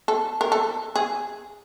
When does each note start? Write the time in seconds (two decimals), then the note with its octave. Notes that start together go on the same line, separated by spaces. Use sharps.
0.08 A4
0.41 A#4
0.52 A4
0.96 G#4